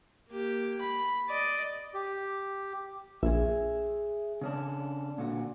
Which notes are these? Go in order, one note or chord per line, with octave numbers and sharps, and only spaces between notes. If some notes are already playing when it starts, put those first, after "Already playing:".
A#3 G4
B5
D5 D#5
G4
A#1 G#4 E5
C#3 C#4 D4
A#2 D3 F#4